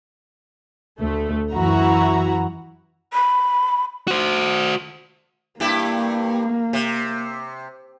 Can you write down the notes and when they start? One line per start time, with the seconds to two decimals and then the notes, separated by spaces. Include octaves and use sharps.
1.00 D2 A3
1.53 F#2 E3 E4 F#4 A#5
3.13 B5
4.08 F#4 C5
5.60 G2 A#3 E4 G4
6.73 C3